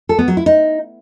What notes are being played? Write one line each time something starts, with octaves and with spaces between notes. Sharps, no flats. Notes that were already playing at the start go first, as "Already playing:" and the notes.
A4
B3
F#3
E4
D#4